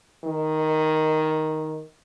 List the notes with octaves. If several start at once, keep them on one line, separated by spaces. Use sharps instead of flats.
D#3